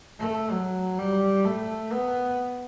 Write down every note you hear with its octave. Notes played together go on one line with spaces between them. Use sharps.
A3
F#3
G3
A3
B3